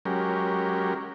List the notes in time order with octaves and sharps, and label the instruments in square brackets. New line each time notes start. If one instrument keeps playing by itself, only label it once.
[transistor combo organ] F#3 G#3 C#4 G4 A#4